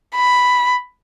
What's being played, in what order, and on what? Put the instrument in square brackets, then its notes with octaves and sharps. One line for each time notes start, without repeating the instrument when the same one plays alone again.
[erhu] B5